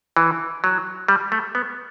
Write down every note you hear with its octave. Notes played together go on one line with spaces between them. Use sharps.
E3
F#3
G3
A3
B3